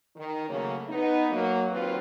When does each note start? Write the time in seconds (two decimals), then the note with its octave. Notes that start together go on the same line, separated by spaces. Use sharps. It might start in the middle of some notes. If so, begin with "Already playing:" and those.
0.16 D#3
0.48 C#3 F#3 A3 A#3 C#4
0.88 B3 D#4
1.31 F#3 A#3
1.71 D#2 F#3 C4 F4 B4